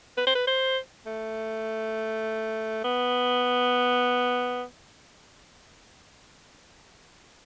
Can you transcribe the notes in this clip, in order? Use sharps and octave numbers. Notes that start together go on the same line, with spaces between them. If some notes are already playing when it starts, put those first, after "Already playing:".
B4
C5
B4
C5
A3
B3